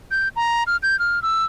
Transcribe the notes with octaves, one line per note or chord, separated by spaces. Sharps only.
G6
A#5
F6
G6
F6
E6